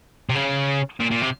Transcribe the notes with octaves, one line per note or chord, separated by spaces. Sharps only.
C3
C#3
A#2
A#2
C3